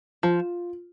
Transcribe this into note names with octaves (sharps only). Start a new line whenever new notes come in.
F3 F4